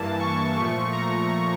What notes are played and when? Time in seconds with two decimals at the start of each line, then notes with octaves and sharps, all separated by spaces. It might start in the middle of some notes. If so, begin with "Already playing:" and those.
Already playing: G2 E3 A#3 A5
0.19 C#6
0.56 A#2 F3 A3 C#6
0.92 A#5